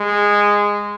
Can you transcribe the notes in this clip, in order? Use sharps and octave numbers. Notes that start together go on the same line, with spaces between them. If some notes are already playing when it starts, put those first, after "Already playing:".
Already playing: G#3